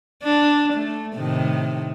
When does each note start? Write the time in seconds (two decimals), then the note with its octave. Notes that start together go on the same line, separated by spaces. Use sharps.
0.23 D4
0.73 A3
1.16 A2 C3 D#3